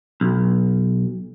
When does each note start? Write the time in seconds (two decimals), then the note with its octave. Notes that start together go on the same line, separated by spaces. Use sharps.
0.21 B1